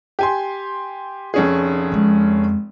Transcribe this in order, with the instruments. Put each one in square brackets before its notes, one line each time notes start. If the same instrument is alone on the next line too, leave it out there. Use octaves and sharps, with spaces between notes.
[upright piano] G4 G#5 C6
F1 C#4 G#4
[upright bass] F2 G#3